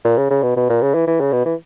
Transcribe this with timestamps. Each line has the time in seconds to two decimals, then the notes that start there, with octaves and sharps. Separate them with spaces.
0.05 A#2
0.17 C#3
0.31 C#3
0.43 B2
0.56 B2
0.70 A#2
0.82 C#3
0.95 E3
1.07 E3
1.20 C#3
1.32 B2
1.45 E3